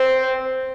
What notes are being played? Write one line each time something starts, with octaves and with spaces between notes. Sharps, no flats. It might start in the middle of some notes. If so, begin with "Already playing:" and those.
Already playing: C4